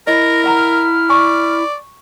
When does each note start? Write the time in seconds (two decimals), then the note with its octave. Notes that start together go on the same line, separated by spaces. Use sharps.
0.07 E4 A#4 D#5 A#6
0.44 E5 F#5 A#5 F6
1.10 D5 G#5 C#6